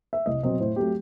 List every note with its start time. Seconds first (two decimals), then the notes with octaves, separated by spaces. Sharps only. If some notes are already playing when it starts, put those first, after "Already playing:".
0.13 E5
0.26 C2 D#5
0.43 B2 F#3 C4 D#5
0.60 A2 C5
0.76 F#3 A3 C4 G4